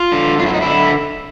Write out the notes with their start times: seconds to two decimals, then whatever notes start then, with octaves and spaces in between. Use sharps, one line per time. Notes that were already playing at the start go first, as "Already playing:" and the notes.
Already playing: F4
0.12 D3
0.39 F#2 F4
0.46 E4
0.54 D#4
0.61 D3 E4